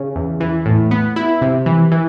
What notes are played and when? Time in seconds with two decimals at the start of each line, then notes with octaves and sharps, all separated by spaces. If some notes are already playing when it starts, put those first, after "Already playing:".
Already playing: C#3 C#4
0.16 E2
0.40 E3
0.66 A2
0.91 B3
1.16 E4
1.42 C3
1.66 E3
1.92 E3